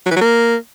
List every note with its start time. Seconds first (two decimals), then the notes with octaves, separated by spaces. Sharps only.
0.06 F#3
0.11 E3
0.16 F#3
0.21 A#3